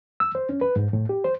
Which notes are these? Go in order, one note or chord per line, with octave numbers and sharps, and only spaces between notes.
E6
C5
C#4
B4
G#2
A2
G4
C5